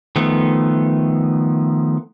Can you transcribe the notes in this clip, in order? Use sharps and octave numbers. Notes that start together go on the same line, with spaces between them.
D#3 F3 A3 B3